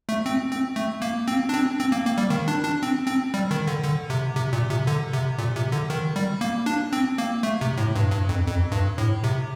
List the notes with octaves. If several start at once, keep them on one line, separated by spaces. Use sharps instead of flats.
A3
C4
C4
A3
A#3
C4
D4
C4
C4
A#3
A#3
G3
D#3
D4
D4
C4
C4
G3
D#3
D3
D3
C3
C3
A#2
C3
D3
C3
A#2
C3
D3
D#3
G3
A#3
D4
C4
A#3
A3
C3
A2
G2
G2
F2
F2
G2
A2
C3